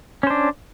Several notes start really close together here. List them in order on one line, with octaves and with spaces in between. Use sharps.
C#4 C5 D4